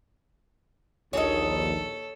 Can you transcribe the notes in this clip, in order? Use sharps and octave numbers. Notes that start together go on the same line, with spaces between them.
A#1 D#2 A4 C#5 D#5